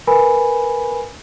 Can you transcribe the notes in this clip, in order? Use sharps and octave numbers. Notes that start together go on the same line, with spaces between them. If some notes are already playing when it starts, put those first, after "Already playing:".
A#4 B4 G#5 B5